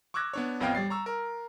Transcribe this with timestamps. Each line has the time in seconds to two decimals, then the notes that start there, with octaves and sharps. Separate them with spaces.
0.14 C#6 D6 E6 F#6 G#6 A#6
0.33 B3 D4 C#5
0.60 A1 F2 B3 D#5 F5 G5
0.75 G3 C#5 A6 C7
0.90 A#5 C#6 E6
1.06 A#4